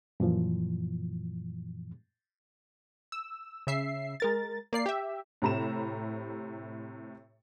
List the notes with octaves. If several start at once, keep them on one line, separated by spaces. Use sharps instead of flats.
F#2 A#2 E3 F3
E6
C#3 E5 C7
G#3 A#4 A6
A#3 D5 C7
G4 E5
A2 C3 A#5 B5 E7